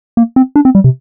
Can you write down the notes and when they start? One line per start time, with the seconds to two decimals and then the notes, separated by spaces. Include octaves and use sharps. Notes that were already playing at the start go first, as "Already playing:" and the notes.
0.17 A#3
0.36 C4
0.56 D4
0.65 C4
0.75 G3
0.84 C3